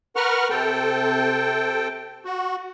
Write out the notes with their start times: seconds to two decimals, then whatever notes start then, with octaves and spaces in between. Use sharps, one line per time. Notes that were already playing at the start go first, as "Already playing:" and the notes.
0.16 A#4 B4 F#5 C#6 F6
0.50 C3 A4 G5
2.25 F#4